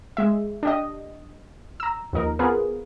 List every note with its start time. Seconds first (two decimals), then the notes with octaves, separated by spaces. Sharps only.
0.17 G#3 E5
0.63 D4 G4 D#5
1.80 A#5 E6
2.13 D#2 F3 D#4 A#4
2.39 B3 F4 G#4 A#4 B4